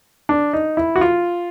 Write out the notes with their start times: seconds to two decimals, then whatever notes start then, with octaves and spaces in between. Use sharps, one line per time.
0.29 D4
0.53 D#4
0.77 E4
0.96 F#4
1.01 F4